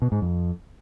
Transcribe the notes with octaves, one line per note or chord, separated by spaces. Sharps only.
B2
G#2
F2